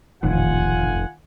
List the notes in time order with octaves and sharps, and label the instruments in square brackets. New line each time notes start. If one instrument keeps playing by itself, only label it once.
[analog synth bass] F1 [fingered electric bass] A#1 E2 A2 [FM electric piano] D#3 [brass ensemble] F4 F#5 G#5